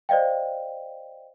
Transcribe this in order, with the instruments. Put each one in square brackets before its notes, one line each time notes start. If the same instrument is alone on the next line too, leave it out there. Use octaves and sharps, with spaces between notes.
[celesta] C5 D5 D#5 F5 G5